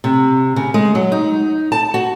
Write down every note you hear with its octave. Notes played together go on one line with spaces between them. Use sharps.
C3
C#3
G#3
F#3
D#4
A5
F#4